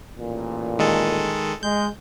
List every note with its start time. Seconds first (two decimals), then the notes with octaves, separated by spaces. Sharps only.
0.17 A1 A#2
0.79 D#3 G#3 A4
1.63 G#3 G6